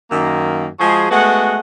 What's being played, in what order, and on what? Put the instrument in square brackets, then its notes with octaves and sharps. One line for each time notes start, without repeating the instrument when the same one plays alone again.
[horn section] F#2 D#3 A#3
F3 G#3 F#4 G#4
G#3 A3 B3 F#4 F#5